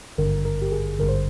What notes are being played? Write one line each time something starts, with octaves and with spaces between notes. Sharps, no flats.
G#1 G2 D3 A#4
A#4
G4
G#4
G#1 G2 D3 A#4
C5